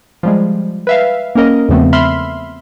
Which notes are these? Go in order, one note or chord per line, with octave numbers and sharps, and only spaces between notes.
F3 G3 G#3
B4 E5 F5
A#3 C#4 A#4 D#5
E2 C#3 F3 A3 B3 C4
E5 B5 C6 F6